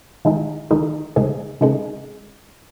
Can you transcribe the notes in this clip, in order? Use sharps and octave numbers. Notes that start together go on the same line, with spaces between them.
D#3 G#3 D#4
D#3 G#3 D#4
C#3 G#3 D#4 G#4
C#3 G#3 D#4 G#4